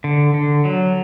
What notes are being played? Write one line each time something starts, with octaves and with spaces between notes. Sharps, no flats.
D3
D3
F#3